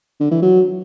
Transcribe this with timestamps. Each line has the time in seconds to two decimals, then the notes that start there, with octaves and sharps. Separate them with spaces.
0.20 D3
0.31 E3
0.42 F#3